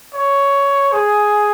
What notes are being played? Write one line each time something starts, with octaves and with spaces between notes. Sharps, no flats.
C#5
G#4